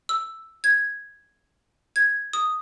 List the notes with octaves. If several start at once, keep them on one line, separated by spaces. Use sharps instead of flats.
E6
G#6
G#6
D#6